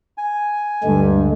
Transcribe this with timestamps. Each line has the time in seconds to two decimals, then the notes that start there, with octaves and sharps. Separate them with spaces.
0.18 G#5
0.83 D2 G2 D3 G#3